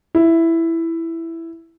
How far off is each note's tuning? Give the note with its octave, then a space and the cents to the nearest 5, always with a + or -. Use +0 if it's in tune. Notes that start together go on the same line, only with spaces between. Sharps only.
E4 +5